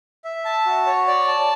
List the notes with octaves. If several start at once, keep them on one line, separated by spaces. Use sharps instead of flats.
E5
A5
F#4
C#5
D5
A5